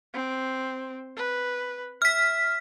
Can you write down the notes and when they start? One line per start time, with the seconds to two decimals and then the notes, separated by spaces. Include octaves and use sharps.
0.14 C4
1.17 B4
2.02 E5 F6 B6